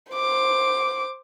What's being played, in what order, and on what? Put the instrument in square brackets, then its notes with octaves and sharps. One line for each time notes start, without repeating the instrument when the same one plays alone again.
[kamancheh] C5 D6